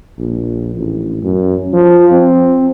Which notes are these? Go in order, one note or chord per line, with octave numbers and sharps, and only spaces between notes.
A#1
A1
F#2
F3
C4